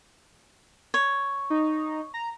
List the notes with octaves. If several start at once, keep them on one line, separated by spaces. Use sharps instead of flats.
C#5
D#4
A#5